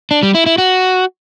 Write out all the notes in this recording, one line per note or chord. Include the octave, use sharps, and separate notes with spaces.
D4
G3
E4
E4
F#4